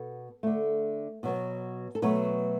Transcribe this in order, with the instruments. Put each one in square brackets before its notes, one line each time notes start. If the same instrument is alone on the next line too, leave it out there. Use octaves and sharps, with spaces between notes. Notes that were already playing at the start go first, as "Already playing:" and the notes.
Already playing: [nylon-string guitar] B2 B3 A4
D3 A3
B2 F#3 B3
A4
B2 F#3 A3 B4